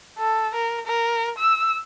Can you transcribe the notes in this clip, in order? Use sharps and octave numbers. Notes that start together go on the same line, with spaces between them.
A4
A#4
A#4
E6